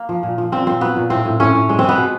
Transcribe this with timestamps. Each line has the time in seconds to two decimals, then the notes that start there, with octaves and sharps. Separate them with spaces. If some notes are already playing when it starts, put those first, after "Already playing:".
Already playing: A#3
0.09 F3
0.23 A#2
0.38 F3
0.52 A#2 C4
0.66 A#2 C4
0.81 F#3 B3
0.96 A#2
1.10 A2 C4
1.25 A2
1.40 A2 C#4
1.55 A2
1.69 G#3
1.79 C4
1.84 G#3 B3
1.98 B2